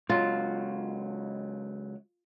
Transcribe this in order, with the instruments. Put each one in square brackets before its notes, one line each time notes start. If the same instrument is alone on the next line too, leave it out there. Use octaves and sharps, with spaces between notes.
[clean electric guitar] C#2 F#3 [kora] F4